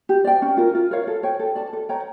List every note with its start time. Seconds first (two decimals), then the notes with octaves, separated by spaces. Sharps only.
0.09 G4
0.24 D5 G5
0.42 C#4
0.57 F4 A#4
0.75 F4
0.91 A#4 C#5 F5
1.07 A4
1.23 C#5 G5
1.39 A4
1.55 D5 A5
1.73 A4
1.89 C#5 G5 A#5